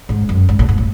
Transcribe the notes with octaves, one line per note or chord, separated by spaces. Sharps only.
G#2
F#2
G#2
A2
G#2
A2